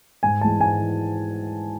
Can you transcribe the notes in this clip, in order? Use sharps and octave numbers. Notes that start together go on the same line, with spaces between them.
G#2 G#5
E3 G#3 A5
G#2 G#5
E3